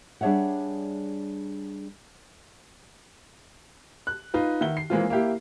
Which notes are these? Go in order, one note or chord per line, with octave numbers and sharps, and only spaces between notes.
G3 D4 G#4 C#5 E5 F#5
F#6
D#4 F4 B4
D#3 E5 F#5 G7
C7
E3 G#3 A#3 C4 F4
A#3 E4 G4